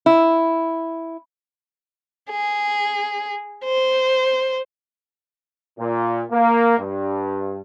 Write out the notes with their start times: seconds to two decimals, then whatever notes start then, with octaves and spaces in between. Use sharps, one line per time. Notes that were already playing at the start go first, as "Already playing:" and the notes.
0.06 E4
2.31 G#4
3.65 C5
5.79 A#2
6.31 A#3
6.78 G2